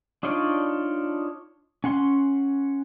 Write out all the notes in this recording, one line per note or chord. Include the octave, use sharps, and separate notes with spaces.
D4 D#4 F4 C#5 D5
C#4 F#5 C6